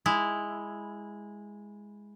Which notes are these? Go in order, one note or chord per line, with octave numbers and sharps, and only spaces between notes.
G#3 E4